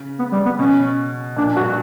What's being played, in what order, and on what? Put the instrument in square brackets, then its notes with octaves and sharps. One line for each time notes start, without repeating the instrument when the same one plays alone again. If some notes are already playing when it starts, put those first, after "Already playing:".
Already playing: [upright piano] C#3
[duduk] B3
G3
B3
[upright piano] B2 [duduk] C#4
[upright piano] A#2 [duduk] D4
[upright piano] G2 [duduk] F#4